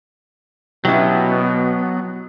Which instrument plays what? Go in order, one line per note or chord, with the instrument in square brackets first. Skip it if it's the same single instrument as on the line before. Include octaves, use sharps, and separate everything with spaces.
[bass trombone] B2 [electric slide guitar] F#3 B3 [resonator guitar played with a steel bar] C#4 E4 G4